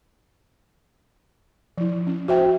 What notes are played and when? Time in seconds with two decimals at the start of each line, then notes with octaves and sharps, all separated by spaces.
1.78 F3 E4
2.07 C#4
2.28 F#4 C5 E5 G5